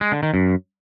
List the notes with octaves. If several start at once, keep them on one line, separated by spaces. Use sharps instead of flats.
G#3
D3
D#3
F#2